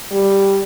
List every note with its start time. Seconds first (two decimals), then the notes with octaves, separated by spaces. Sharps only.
0.11 G3